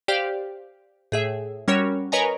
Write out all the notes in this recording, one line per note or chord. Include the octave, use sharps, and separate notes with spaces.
G4 C5 D5 F5 G5
A2 G#4 E5
G3 C#4 F#4 A#4 C#5
A#4 B4 C#5 D#5 G#5 A#5